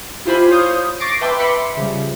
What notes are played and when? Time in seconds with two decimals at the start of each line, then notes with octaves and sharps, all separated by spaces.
0.25 E4 F4 G4 C5 G#5 B5
0.50 C5 C#5 F5 D#6 G6
1.00 C#6 D6 A6 A#6 C7 D7
1.21 B4 E5 G5 A5 C6 D6
1.38 E5 B5 C6 D6 B6 C#7
1.77 C#3 F3 G3